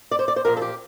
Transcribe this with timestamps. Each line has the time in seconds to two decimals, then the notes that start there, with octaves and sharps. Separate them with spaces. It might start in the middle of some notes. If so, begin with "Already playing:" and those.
0.11 D5
0.19 C5
0.28 D5
0.36 C5
0.45 A#2 F3 A#4
0.57 A4
0.62 G4